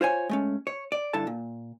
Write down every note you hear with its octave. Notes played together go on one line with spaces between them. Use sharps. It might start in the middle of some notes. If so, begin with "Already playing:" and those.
F4 C5 C#5 G#5
G#3 A3 C#4
C#5
D5
G2 D3 E4 A4 A5
A#2